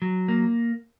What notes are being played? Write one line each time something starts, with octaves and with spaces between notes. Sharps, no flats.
F#3
A#3